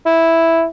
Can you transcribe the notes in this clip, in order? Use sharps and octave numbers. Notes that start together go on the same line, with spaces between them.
E4